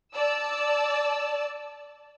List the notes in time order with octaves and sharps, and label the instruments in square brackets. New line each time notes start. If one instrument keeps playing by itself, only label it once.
[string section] D5 A5 E6